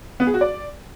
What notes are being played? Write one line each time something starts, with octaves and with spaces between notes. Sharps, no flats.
B3
G#4
F#4
D5